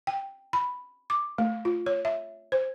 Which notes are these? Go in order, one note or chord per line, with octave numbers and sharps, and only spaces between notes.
G5
B5
D6
A3
F4
C#5
E5
C5